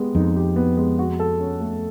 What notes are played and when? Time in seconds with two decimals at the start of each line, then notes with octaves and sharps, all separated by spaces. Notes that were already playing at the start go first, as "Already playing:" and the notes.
Already playing: G#3 B3 G4
0.15 F2 D#4
0.36 G4
0.56 B3
0.77 G#3
0.99 F#4
1.20 A4
1.40 C#4
1.60 A3